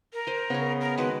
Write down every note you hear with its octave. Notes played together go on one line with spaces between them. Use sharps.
A#4
C5 G#5
C#3 B3 C#5
A#4
D#3 G#3 F#4 B4